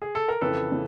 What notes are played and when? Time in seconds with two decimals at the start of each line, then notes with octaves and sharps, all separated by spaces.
0.02 G#4
0.15 A4
0.28 A#4
0.41 F2 C#3 E3 A4 B4
0.71 C#3 E3